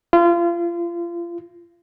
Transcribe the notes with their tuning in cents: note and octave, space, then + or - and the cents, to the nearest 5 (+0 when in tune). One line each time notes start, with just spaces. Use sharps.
F4 -30